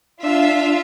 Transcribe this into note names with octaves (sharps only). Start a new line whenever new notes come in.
D4 F4 E5 F5